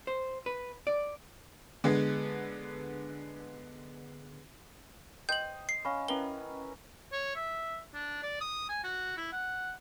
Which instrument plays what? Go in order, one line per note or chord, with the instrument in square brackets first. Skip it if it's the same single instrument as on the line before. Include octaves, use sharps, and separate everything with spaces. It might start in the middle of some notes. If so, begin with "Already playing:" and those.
[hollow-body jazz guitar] C5
B4
D5
[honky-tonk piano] D3 G#3 B3
[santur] C5 D#5 [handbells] G5 [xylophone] G6 F#7
[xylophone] C7
[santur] C#4 [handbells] F5 B5
[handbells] C#4 D#5 G5 [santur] E4 A#4 B4 [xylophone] G7
[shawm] C#5
E5
D4
D5
D#6
G#5
F#4
E4
F#5